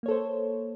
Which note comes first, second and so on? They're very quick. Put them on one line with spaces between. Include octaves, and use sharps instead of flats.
A#3 C#5 A4 C5